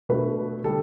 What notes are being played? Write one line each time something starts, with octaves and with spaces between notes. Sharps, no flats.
B2 A3 D4 B4
D3 G3 A4